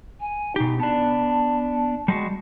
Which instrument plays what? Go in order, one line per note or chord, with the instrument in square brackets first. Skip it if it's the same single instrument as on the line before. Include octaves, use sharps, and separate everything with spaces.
[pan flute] G#5
[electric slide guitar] B2 G4 [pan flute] D#4
[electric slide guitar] B3 D4 [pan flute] A5
[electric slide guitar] G3 G#3 F#4